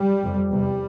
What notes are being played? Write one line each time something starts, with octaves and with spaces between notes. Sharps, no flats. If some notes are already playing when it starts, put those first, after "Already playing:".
Already playing: G3
F2 C3
E2 C3 G3